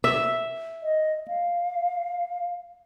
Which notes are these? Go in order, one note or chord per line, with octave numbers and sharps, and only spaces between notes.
E5
D#5
F5